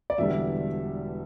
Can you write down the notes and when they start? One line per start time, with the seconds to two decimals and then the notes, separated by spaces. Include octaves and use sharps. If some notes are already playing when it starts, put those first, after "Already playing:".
0.10 D5
0.18 E1 E2 D3 G3 E5